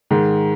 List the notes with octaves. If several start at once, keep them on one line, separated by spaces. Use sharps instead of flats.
G#2 D#3 G#3